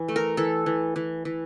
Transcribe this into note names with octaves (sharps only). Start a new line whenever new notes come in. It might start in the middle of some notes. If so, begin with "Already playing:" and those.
Already playing: E3
A3
A#4
E3 A4
E3
E3
E3